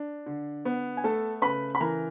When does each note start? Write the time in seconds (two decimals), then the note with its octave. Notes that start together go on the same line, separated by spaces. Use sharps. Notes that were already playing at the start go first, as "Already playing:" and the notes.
Already playing: D4
0.26 D3
0.65 B3
0.97 G#5
1.04 A3 A4 A5
1.42 C#3 B4 B5
1.75 B5
1.80 E3 A#4 A#5